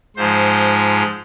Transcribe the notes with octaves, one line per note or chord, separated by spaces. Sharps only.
G#2 F3 G#3 C5